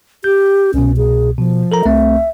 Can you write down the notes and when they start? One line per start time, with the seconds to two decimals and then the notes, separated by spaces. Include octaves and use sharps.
0.24 G4 G6
0.74 C2 B2 C#4
0.97 G#4
1.38 B2 F3
1.72 A4 A#4 A#5
1.85 C2 A3 C4 E5